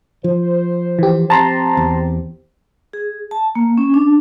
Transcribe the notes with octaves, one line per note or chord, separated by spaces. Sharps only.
F3 C5
E3 G4
C4 G4 A5 A#5 C6
E2
G#4
A5
A#3
C#4
D4